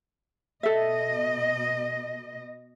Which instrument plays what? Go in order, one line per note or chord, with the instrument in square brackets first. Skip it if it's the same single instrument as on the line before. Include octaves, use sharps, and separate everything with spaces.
[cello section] B2 D#5 [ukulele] A4 E5